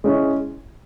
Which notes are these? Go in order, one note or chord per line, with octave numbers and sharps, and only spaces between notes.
G#3 C#4 E4